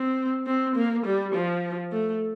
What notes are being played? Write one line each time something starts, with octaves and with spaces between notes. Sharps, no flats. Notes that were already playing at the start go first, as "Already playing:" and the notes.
Already playing: C4
C4
A#3
G3
F3
A3